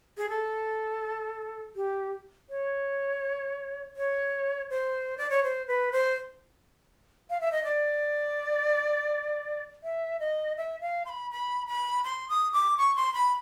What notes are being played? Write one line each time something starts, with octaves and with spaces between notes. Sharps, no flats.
G#4
A4
G4
C#5
C#5
C5
D5
C#5
C5
B4
C5
F5
E5
D#5
D5
E5
D#5
E5
F5
C6
B5
B5
B5
C6
D#6
D6
C#6
C6
B5